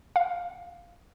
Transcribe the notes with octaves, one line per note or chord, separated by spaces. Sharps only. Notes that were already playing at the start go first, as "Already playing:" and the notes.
F5